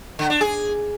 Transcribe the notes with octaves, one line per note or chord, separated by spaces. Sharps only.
D3
D4
G#4